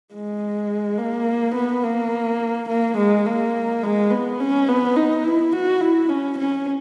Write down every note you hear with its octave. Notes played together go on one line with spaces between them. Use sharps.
G#3
A#3
B3
A#3
A#3
G#3
A#3
G#3
B3
C#4
B3
D#4
E4
F#4
E4
C#4
C#4